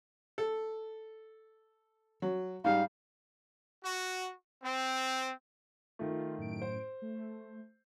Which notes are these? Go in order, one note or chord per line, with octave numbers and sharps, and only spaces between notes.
A4
F#3
G#2 G3 F5
F#4
C4
D#3 A3 F4
F#2 A2 D7
C5
A3